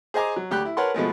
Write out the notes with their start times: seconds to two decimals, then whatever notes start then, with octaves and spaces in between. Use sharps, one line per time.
0.14 G#4 C5 D#5 G#5 A#5 D6
0.36 F#3
0.51 D2 G4 G5 B5 F#6
0.65 E4
0.77 A#4 B4 C#5 F#5 A5 C6
0.94 B2 F3 G#3 A3